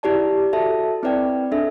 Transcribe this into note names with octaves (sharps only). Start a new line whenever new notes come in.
E4 G4 D5 A5
F#4 A4 E5 A5
C4 E4 B4 D5 G5
D4 A4 E5